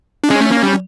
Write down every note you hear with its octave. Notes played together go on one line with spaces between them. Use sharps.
D4
G#3 C#4
A3
A#3
G3